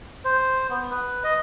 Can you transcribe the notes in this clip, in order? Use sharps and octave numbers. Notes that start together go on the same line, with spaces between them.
C5
B3
B4
D#5